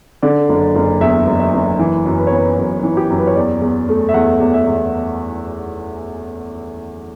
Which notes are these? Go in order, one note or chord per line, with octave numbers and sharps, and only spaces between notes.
D3 D5
F#1
F#1
E2 E5
F#1
E5
F#1
E3
F#2
B4
C#5
B3 B4
F#2
E3
G4
F#2
B4
C#5
E2 D5
E2
A3
E5
E2 F#5
E2
E5
E2